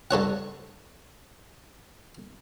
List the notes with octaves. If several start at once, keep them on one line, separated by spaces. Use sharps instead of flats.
G2 A4 C#5 F#5